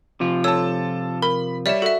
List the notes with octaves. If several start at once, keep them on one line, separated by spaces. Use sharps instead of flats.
C3 F3 F4
A4 C#5 A5 E6
A#4 B5
G3 C#5 D5 E5 E7
F#4 A4 E5